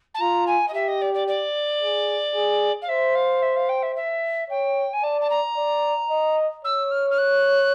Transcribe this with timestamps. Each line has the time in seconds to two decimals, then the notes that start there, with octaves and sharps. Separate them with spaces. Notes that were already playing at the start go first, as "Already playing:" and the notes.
0.14 A5
0.21 F4 A#5
0.47 G#5
0.68 D#5
0.74 G4 E5
0.88 D#5
1.01 D5
1.14 D5
1.28 D5
1.82 G#4
2.35 G#4
2.82 F5
2.88 C5 E5
3.15 F5
3.42 E5
3.56 F5
3.69 G5
3.83 E5
3.96 E5
4.50 C#5 G5
4.93 G#5
5.03 D5 A5
5.21 A5
5.30 A#5
5.57 D5
6.10 D#5
6.64 C#5 E6
6.91 F6
7.11 F6
7.18 F#6